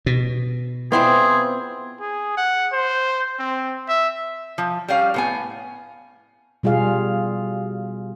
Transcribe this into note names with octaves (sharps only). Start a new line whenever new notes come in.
B2
B3 C4 E4 F4 G#4 C5 D5
G#4
F#5
C5
C4
E5
F3
G3 C#4 F5
A2 B3 G#5
B2 G3 F4 G#4 F5